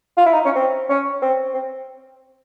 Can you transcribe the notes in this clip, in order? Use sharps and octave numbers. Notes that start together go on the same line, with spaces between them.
F4
E4
D#4
C#4
C4
C#4
C4
C4